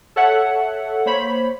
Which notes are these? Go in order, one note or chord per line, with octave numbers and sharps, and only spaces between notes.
A4 C#5 E5 F#5
A#3 C5 C#5 B5